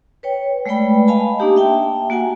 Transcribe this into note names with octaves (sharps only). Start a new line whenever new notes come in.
B4 C#5 G5
G#3 A3 B4 D5 G5 B5
D#5 F5 G#5 A5 B5
A#3 D4 D#4 G4 A5 A#5
E5 G5 A5
A#3 F#4 F#5 G#5